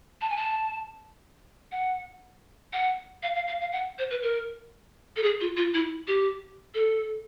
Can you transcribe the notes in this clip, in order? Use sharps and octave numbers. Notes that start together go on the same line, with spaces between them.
A5
G#5
A5
F#5
F#5
F5
F5
F5
F5
F#5
C5
B4
A#4
A4
G#4
F4
F4
E4
G4
A4